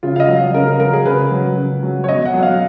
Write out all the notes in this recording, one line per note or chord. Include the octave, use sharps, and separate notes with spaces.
C#3 F4
F5
D#5
F#3
F5
C#3 A#4
A#4
F#3 A#4
G#4
C#3 B4
F#3
C#3
F#3
C#5
B2 D#5
F#5
F#3
F5